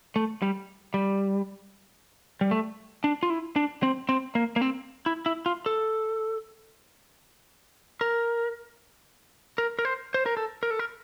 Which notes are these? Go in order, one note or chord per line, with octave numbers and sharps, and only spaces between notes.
A3
G3
G3
G3
A3
D4
F4
E4
D4
C4
C4
A#3
A#3
C4
E4
E4
F4
A4
A#4
A#4
A#4
C5
C5
A#4
A4
A#4
A4
A#4